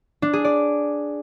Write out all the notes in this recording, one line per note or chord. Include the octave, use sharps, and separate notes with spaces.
D4
G#4
D5